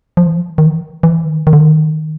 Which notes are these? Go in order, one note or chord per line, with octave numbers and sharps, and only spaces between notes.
F3
E3
F3
E3
D#3
E3
E3
D#3
D#3
D3
D#3